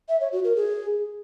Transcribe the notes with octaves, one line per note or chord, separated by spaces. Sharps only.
E5
C#5
F#4
A#4
G#4